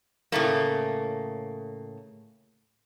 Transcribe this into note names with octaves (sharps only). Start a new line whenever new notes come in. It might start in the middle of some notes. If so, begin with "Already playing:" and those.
A2 C#3 A3 A#3